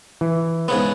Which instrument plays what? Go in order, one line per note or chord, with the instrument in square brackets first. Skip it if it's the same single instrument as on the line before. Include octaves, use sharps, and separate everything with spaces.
[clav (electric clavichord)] E3
[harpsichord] G#2 C#3 B3